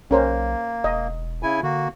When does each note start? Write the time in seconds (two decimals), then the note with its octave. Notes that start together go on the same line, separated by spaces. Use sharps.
0.11 B1 A#3 C#4 A#4 C5
0.84 E1 D#5
1.43 C#3 E4 G#5
1.63 D3 A#3 F#4